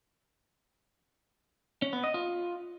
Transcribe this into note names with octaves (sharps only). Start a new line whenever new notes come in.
C#4
B3
D#5
F4